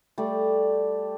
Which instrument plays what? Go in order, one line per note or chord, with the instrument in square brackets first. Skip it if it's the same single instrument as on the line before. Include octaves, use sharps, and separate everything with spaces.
[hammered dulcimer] G3 A3 D5